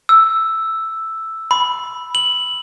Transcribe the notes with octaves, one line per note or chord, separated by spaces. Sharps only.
E6
B5
F#7